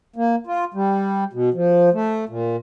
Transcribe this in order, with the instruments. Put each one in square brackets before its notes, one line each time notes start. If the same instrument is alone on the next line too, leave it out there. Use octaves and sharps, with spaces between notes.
[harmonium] A#3
F4
G3
B2
F3
A3
A#2